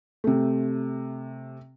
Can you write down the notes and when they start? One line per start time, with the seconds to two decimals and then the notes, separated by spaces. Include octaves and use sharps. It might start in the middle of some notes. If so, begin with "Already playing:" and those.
0.24 C3 A3